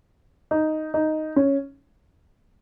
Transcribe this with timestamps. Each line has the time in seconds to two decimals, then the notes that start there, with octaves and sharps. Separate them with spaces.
0.51 D#4
0.94 D#4
1.36 C#4